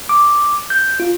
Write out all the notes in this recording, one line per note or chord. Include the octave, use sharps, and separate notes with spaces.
D6
G6
F4